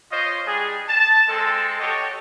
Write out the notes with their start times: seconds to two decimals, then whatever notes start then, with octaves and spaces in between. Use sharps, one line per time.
0.12 F4 C5 C#5 D#5
0.47 G3 D4 G#4
0.89 A5
1.29 G#3 C4 A4
1.80 F#4 G4 A4 C#5 D#5